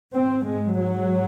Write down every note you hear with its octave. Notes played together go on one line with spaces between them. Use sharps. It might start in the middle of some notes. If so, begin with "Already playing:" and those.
G#2 C4
G#3
F#3